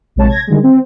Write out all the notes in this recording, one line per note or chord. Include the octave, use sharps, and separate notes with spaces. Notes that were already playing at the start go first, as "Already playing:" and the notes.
A#1 C3 G#3 C#5 A5
G#6 A#6
D3 D#3 G3 G#3
C4